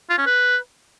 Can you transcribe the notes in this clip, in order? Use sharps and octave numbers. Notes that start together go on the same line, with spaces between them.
F4
C#4
B4